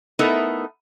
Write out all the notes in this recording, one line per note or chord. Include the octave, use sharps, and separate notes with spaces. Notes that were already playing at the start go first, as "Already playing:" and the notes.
A3 B3 D#4 E4 A#4 E5